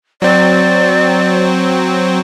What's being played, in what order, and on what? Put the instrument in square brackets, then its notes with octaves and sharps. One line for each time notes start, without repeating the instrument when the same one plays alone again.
[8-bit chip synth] F#3 C4 [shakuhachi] D5